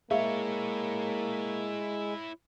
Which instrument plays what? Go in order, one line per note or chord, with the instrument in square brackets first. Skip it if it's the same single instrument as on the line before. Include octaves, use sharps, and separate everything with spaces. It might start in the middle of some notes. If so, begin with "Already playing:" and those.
[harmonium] G#3 [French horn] A#3 [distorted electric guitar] E4 C#5 [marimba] G#4 E5 F5